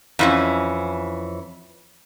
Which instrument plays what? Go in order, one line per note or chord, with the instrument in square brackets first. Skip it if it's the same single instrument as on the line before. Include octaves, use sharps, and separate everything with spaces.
[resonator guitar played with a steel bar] F2 E3 C#4